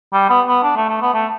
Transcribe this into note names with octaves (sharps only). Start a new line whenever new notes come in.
G3
B3
B3
D4
A3
A3
B3
A3